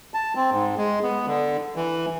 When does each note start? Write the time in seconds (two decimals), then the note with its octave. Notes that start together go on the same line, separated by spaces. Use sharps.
0.14 A5
0.36 C4
0.52 G#2
0.78 G#3
1.03 B3
1.26 D3
1.76 E3